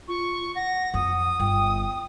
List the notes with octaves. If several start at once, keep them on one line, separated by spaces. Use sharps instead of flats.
F4 C#6
F#5 A#6
F2 D#6
G1 G5